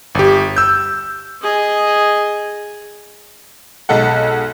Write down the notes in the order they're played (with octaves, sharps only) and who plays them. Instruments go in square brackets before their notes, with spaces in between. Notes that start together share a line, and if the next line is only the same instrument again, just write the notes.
[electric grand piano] G1 G4
E6 G6
[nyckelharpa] G#4 D#5
[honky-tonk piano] B1 G#3 A4 F#5